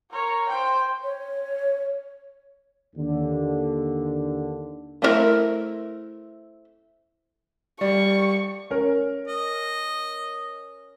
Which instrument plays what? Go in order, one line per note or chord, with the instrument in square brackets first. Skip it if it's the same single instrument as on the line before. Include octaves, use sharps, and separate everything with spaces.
[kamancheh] A#4 C#5
C5 G5
[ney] C#5
[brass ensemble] D#2 D3
[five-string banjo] A3 C4 D4 E4 A#4
[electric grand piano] G3 [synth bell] D5 [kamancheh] C#6
[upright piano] C#4 A#4
[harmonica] D#5